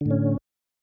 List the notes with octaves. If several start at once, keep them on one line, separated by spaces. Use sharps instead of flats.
A2 D3 C#4